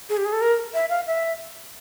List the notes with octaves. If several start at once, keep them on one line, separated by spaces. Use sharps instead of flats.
G#4
G4
G#4
A4
A#4
E5
F5
E5